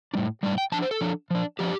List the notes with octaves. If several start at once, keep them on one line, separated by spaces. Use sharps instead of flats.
A2 G3 D4
A2 G3 D4
G5
F3 D4 A5
C5
A4
F3 D4
F3 D4
F3 D4 G4